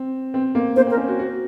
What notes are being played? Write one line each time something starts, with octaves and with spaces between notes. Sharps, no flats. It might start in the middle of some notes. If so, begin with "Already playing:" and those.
Already playing: C4
C4
A#3
A#3 C5
C4
A#4
C#4
F#4
F#4